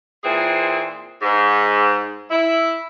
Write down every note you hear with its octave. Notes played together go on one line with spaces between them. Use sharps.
A#2 E3 C4 G#4
G#2
E4